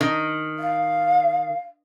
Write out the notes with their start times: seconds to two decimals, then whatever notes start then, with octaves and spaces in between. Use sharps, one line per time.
0.01 D#3
0.59 F5